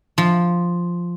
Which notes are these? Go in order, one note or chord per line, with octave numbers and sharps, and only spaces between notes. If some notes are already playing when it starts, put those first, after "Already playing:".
F3